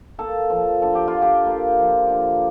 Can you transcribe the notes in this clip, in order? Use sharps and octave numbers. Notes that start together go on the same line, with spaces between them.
A#3 A4
F3
D3 A4
G4
F4
D3
G4
A#3
F3
D3